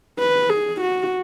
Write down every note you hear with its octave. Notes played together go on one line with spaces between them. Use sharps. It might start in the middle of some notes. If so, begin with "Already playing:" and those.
B4
G#4
F#4